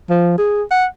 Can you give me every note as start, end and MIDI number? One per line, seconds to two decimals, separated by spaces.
0.10 0.36 53
0.38 0.63 68
0.71 0.86 78